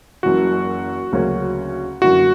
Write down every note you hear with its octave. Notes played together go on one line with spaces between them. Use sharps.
F#1 F#2 E3 F#4
D2 C#3 F#3 A#3 C#4
F#1 F#2 D3 A#3 E4 F#4